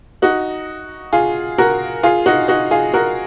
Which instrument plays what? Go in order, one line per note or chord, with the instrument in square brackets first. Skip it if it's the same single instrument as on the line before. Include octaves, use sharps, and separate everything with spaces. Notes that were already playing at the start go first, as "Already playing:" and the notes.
[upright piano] D#4 F#4
F4 G#4
F#4 A#4
F4 G#4
D#4 F#4
D#4 F#4
F4 G#4
F#4 A#4